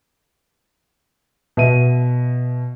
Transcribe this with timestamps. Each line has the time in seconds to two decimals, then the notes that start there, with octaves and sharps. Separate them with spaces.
1.57 B2 E5 D#7